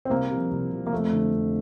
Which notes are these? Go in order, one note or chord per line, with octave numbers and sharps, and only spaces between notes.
C4
C2 A#3
C3 F3
C2
C3 F3
A#3
F2 A3
D3 F3
F2